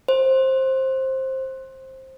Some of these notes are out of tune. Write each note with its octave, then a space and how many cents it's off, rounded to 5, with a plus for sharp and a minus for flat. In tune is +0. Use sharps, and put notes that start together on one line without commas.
C5 +15